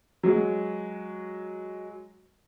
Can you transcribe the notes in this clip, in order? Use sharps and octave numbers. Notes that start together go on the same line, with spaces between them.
F#3 G#3